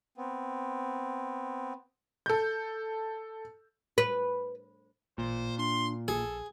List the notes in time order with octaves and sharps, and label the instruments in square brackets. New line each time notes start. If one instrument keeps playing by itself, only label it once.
[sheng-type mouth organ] B3 C4
[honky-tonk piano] A4 G6
[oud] B4
[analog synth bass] A1 [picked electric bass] A#2 [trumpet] C5
[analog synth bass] D4 [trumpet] C6
[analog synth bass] A#1 [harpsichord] G#4 [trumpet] A4